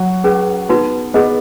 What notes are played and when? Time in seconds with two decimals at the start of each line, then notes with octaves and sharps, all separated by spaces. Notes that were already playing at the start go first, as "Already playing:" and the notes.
Already playing: F#3 F#4
0.24 C#4 G#4 B4
0.69 B3 D#4 F#4 B4
1.14 B3 G#4 B4 D#5